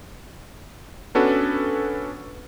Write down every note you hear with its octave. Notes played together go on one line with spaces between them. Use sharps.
B3 C#4 D4 F#4 A4 B4